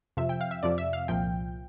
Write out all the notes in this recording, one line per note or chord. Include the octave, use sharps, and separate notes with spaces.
F2 C3 F3 E5
G5
F5
E5
F2 C3 F3 D5
E5
F5
C2 A#2 F3 G5